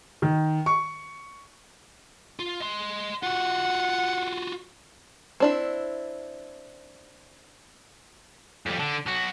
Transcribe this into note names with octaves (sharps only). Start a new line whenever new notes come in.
D#3
C#6
F4
D#5 C6
F4 F#4 F#5
C4 D4 E4
F2 G3
D3
B1 F#4